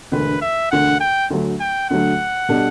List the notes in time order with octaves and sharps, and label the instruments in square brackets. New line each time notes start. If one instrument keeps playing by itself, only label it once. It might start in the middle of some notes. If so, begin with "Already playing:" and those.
[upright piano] E1 D2 D3 [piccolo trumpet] B4
[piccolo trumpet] E5
[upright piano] E1 D2 D3 [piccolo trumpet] F#5
[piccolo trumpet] G5
[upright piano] D2 D3 F#3 A3
[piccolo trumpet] G5
[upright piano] D2 D3 F#3 A3 [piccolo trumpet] F#5
[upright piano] B2 G3 D4 A4